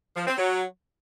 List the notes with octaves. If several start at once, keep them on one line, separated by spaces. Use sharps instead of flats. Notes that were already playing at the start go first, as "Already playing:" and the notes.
F3
C4
F#3